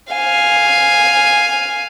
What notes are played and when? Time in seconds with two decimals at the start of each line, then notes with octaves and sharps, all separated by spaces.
0.13 F5 G#5